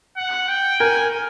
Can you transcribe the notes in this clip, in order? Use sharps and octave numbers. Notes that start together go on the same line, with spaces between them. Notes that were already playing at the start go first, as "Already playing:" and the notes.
F#5
G5
A#4 G#5